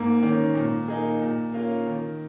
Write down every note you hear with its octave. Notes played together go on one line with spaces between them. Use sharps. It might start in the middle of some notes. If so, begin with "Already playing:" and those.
Already playing: G#2 A#3
D#3 C#4
A#2
A#3 D#4 G#4
A#2
A#3 C#4 F4
D#3